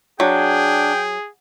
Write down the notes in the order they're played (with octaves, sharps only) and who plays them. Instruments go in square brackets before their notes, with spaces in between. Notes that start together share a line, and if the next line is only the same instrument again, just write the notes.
[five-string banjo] F#3 [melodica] D4 [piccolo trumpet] G#4 [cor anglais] G5